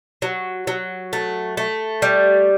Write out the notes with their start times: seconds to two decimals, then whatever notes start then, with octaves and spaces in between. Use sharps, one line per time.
0.22 F#3
0.67 F#3
1.13 A3
1.57 A3
2.02 G3